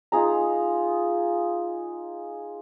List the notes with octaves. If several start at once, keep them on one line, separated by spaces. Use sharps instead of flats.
D#4 F4 G#4 A#5